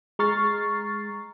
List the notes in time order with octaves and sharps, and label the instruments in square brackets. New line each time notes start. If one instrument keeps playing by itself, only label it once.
[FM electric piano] G#3 A#5 C#6 F6 A6 C7